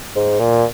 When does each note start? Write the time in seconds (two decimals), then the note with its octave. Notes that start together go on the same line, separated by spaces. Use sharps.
0.16 G#2
0.39 A#2